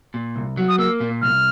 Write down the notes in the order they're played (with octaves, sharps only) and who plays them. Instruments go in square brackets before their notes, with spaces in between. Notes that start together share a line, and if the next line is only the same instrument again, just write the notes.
[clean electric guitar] A#2
C2
F#3
[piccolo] D#6
[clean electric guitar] A#3 [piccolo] E6
[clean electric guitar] A#2
[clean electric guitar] C2 [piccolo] F6